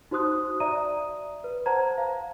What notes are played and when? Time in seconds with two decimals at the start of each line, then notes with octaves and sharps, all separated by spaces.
0.11 D#4 F#4 C5 C6 D#6 F#6
0.60 D5 E5 A#5 D#6 D#7
1.44 B4
1.66 C5 F#5 A5 A#5 G#6
1.98 F5